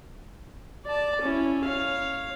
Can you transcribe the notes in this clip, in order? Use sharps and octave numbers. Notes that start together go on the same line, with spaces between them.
D5 A5
C#4 E4
C#5 F5